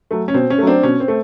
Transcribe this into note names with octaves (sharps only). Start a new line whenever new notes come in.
F#3 A3
C#4
B2 C4
C#4
F#3 A3
C4 D4
B2 C#4
C4
A3